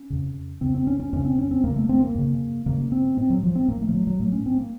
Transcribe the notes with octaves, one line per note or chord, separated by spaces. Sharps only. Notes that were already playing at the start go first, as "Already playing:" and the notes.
Already playing: C#4
F2 C#3
F2 C#3 C4
C4
C#4
C#4
F2 C#3 C#4
C4
C#4
C4
F2 C#3 A#3
A3
C4
A#3
F#2 C#3
F#2 C#3 A#3
C4
A2 C4
F#3
F3
C4
A2 A#3
A3
F3
F#3
F#3
A2 A3
C#4
C4
A#3